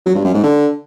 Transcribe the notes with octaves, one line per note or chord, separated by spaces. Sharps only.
F#3
G2
F#2
G#2
D3